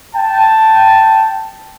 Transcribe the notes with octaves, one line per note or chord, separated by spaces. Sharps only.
G5 A5